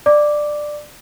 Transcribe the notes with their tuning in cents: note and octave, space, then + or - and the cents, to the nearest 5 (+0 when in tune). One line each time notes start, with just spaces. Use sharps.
D5 +15 D6 +0